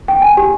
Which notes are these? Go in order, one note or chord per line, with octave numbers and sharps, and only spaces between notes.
G5
G#5
G4